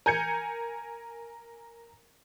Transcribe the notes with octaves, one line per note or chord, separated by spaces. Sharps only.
A#4 G#5 G6 G#6 C#7